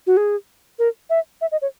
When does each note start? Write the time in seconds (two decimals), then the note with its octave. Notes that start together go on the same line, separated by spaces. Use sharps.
0.07 F#4
0.17 G#4
0.79 A#4
1.10 E5
1.41 E5
1.52 D#5
1.62 C#5